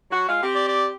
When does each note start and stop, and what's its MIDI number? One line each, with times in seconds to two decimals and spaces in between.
0.11 0.25 54
0.11 0.25 66
0.27 0.39 56
0.27 0.39 65
0.27 0.39 77
0.42 0.92 60
0.42 0.92 67
0.55 0.66 74
0.68 0.87 74